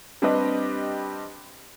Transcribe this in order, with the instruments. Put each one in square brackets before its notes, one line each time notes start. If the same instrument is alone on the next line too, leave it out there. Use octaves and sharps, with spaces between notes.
[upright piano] G3 C4 D4 G4 B4 D#5